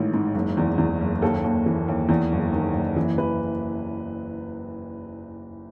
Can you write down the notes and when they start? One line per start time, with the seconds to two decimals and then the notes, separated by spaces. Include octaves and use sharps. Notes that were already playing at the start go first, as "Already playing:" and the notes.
Already playing: A1 G#2 D#3
0.14 G#2
0.35 F#1
0.57 E2
0.78 E2
1.01 F#1
1.22 D#2 A4
1.44 D#2
1.66 E3
1.88 D#2
2.09 E2
2.32 F#1
2.52 D#3
2.75 F#1
2.96 E3
3.18 E3 B4